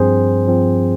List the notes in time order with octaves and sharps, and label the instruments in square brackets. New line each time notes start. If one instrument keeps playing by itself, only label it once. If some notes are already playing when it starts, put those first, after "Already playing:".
Already playing: [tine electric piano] G2 F3 C4 G#4 C5
G2 F3 C4